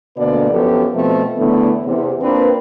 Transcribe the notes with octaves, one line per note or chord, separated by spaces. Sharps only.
D2 B2 D3 A#3 B4 D5
F#2 F3 B3 G4 A4
B2 F3 A3 C4
E2 A2 D3 A3 B3
E2 C3
A#3 C4 D4 F4 B4